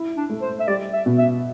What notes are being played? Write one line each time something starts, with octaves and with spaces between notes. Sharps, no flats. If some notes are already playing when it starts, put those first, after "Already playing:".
Already playing: E4
D4
A3
C5
E5
G3 D5
E5
B2
E5